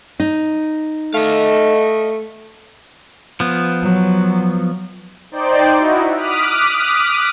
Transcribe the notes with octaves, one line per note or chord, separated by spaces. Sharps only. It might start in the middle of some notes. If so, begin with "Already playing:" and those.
D#4
A3 D#5 F5
F3 B3
F#3
D#4 C5 D5 G5
D#4 E4 F#4
D6 D#6 F6 F#6 B6